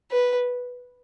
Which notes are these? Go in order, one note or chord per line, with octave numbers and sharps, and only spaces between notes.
B4